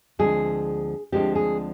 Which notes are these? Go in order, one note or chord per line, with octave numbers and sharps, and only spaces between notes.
D2 D3 F3 G#3 C4 G#4
D2 D3 F3 G#3 C4 G4
G#4